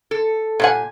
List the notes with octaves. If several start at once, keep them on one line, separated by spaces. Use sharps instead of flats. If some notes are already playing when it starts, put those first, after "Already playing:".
A4
A#2 G3 A4 F#5 G#5